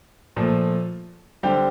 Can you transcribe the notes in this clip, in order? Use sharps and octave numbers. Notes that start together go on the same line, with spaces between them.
A#2 F3 A3
D3 G3 C4 G4